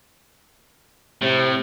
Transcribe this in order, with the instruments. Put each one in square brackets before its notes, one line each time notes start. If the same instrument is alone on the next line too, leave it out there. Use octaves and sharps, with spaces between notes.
[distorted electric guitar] A2 [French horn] C3